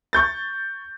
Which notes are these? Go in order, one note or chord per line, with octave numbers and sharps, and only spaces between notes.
C#6 G6 A6